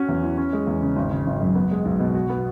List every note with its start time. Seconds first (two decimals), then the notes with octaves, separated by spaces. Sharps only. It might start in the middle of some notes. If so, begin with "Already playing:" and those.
Already playing: C#4 F#4
0.09 E2
0.23 E3
0.37 C#4
0.53 G#3
0.67 E2
0.82 C#3
0.96 G#1
1.11 C#3
1.27 G#1
1.40 F#2
1.55 B3
1.71 G#3
1.85 B1
2.00 B2
2.15 F#4
2.29 B3